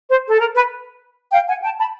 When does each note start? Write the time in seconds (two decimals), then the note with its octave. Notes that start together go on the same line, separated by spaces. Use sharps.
0.09 C5
0.28 A4
0.40 A#4
0.55 B4
1.32 F5 G5
1.47 F#5 G#5
1.63 G5 A5
1.79 A5 B5